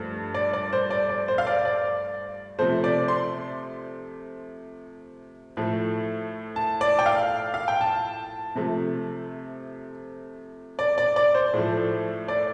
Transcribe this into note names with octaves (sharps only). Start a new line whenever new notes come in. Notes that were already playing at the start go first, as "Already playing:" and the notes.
Already playing: G2 F3 A3
D5
D5
C5
D5
D5
C5
F5
D5
D5
C3 F3 A3 C5
D5
C6
A2 F3 A3
A5
D5
G5
F5
F5
G5
A5
C3 F3 A3
D5
D5
D5
C5
A2 F3 A3
D5